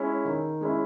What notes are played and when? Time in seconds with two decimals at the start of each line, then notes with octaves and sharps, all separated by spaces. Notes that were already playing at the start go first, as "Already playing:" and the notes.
Already playing: G#3 C#4 E4
0.25 D#3
0.61 G#3 C#4 E4